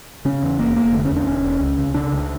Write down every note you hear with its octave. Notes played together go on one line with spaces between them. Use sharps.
C#3 C#4
E2
F1 A#3
F1 A#3
D3 A3
C#4
E2
D4
E1 C#4
E1
C#2
C#3
C#3 D4
C#2